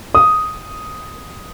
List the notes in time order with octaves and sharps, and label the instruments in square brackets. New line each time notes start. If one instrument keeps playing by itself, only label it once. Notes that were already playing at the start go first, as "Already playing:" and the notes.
[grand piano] D#6